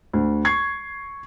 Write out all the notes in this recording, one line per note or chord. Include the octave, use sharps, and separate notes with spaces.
D2
C#6 G#6 C7